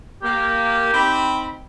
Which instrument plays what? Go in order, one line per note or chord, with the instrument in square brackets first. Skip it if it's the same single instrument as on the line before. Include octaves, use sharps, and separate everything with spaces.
[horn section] A#3 [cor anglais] G4
[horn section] C4 D#4 B5